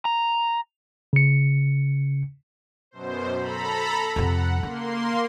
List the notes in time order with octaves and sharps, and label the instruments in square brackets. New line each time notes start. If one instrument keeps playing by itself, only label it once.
[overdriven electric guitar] A#5
[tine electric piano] C#3 C#7
[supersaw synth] F#2 B2 C5
A4 A#5 B5
[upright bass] F2 C3 [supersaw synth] F#5
[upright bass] C#3 [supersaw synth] A#3 C6